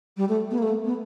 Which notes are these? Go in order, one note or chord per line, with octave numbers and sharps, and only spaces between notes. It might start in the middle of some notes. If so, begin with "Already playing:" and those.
G3
A3
B3
A#3
A3
B3